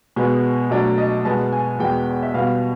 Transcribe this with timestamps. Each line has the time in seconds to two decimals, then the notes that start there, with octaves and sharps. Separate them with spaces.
0.16 B2 G#3 B3
0.70 B2 F#3 A3 D4
0.98 D#5
1.25 B2 G#3 B3 A5
1.52 G#5
1.79 E2 B2 G#3 B3 G5
2.23 E5
2.34 B2 G3 B3 F5